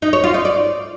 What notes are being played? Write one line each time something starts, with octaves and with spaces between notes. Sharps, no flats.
D#4
C#5
F4
D#4
D5